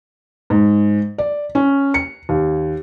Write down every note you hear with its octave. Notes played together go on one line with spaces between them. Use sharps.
G#2
D5
C#4
C#7
D#2